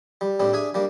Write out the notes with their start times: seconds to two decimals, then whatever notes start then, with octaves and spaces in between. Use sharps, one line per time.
0.21 G3
0.39 A2 G3 C4 D4
0.53 D4 G#4 E5 G#5
0.74 G3 A#3 D4